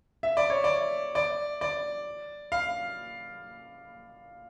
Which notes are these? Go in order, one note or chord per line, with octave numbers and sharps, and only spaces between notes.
E5
D5
C#5
D5
D5
D5
F5